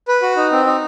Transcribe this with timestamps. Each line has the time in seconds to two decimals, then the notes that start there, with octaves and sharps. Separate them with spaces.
0.08 B4
0.22 F#4
0.36 D#4
0.52 C4
0.66 D#4